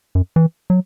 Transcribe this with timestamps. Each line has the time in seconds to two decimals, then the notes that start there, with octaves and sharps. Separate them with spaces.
0.15 F#2
0.36 E3
0.70 F#3